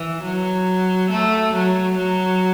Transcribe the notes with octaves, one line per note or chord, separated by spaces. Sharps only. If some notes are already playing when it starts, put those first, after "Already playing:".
Already playing: E3
F#3
A3
F#3
F#3